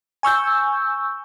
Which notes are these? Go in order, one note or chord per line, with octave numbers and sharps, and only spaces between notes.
G#5 C#6 E6 G6